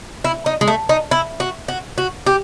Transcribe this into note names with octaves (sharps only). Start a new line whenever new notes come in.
E4
D#4
G#3
A3
D#4
E4
F#4
F#4
F#4
G4